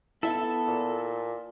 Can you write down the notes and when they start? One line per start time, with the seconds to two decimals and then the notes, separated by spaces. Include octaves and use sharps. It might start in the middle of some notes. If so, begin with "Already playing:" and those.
0.23 B3 E4 A4 E5
0.67 A#2